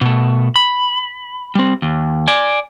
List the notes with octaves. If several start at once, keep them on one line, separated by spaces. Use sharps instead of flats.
B2 A3
B5
G3 C4
D#2
D5 G#5